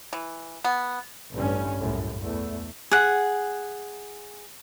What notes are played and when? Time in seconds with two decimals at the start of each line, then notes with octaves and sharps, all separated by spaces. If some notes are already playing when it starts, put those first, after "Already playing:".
0.13 E3
0.64 B3
1.33 A1 G2 C#4
1.79 C2 F#2 A2
2.20 E2 A3
2.92 G#4 F#5